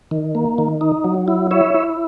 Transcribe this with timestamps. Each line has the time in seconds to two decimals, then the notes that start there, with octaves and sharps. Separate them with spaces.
0.11 D#3
0.35 A#3
0.58 D#3
0.81 D#4
1.04 F#3
1.28 E4
1.51 E4 C#5 E5
1.74 E4